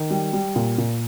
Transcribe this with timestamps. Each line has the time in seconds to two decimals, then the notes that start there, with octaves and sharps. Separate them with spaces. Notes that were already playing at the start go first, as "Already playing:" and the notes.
Already playing: D#3
0.10 G3
0.33 G3
0.56 A#2
0.78 A#2